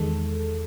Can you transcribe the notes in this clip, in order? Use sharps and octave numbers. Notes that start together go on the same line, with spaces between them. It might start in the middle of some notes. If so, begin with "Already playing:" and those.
Already playing: E2 D#3 G#3 A4